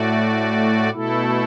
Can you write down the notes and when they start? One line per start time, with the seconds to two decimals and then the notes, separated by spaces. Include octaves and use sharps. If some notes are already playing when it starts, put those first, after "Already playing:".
Already playing: A2 A3 F#4 D5
0.91 B2 A3 E4 A4